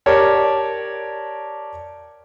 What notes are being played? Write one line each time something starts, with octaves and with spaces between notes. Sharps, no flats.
G4 A#4 C#5 D5 A5